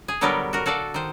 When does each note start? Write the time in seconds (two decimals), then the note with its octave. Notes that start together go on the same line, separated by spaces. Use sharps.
0.08 G#4
0.21 D3 F#3 G3 B3 G4 A#4
0.53 F#4 A#4
0.66 F#4 A4 D5 F5
0.94 D#3 C5